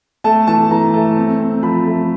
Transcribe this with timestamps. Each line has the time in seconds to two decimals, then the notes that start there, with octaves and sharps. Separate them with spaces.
0.24 A3 A5
0.47 E3 A5
0.71 E3 A#5
0.94 A3
1.17 C4
1.40 C4
1.63 F3 B5
1.86 A3